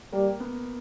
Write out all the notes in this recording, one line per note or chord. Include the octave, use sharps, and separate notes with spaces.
G3 A#3
B3